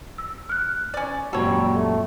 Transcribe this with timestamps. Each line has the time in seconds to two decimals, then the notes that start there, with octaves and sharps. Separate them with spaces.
0.18 E6
0.49 F6 F#6
0.94 C#4 D5
1.33 F#2 A#2 G3 F#4 A4 C#5
1.75 A3